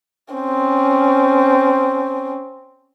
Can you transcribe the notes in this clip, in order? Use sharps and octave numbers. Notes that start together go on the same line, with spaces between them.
C4 C#4